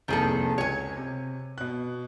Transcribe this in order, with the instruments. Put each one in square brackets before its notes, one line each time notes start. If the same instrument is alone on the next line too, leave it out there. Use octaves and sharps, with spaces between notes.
[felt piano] F1 C2 A#3 [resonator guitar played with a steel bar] D#3 G#4 A4
[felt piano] C#2 [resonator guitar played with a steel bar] C#5 G#5
[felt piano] C3
B2 F#6